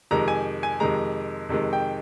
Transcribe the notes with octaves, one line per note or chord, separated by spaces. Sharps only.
F2 C3 D#3 G#3 A#5
G#5
G#5
F2 C3 D#3 G#3 A#5
F2 C3 D#3 G#3
G5